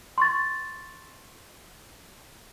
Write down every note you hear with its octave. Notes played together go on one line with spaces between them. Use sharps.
C6 C#6 A6